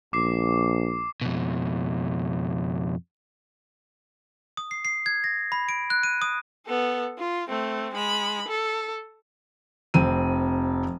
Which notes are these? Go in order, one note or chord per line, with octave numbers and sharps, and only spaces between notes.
A#1 D6 C7
F2 B2
D#6
C7
C7
G#6
A#6
B5
D7
F#6
D#7
D#6
B3 A4
F4
A3 C4
G#3 B5
A4
F1 C4 D#7